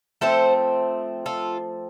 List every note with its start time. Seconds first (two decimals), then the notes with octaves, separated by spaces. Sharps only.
0.21 F3 A3 C4 A4 C5
1.26 F4 A4